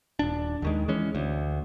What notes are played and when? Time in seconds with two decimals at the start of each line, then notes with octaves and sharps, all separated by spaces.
0.19 D#1 D4
0.62 D#2 D#3 G#3
0.88 E3 G#3 C#4
1.15 D2